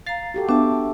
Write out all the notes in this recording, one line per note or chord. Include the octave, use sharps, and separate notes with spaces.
F5 A#5 A6 C7
F#4 G4 A4
B3 D4 E5 A5